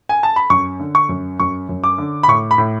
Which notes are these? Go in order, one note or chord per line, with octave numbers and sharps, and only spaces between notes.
G#5
A5
B5
F#2 C#6
D3
C#6
F#2
F#2 C#6
F#2
D6
D3
B5
A2 C#6
B5
A2